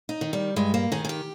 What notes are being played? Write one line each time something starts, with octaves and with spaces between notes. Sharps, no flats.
D#4
D#3
G3
G2 G#3
A#3
D#3 G#4
G#4
G4